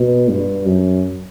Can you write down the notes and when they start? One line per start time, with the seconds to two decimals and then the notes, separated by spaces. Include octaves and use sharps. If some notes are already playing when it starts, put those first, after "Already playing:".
Already playing: B2
0.29 G2
0.65 F#2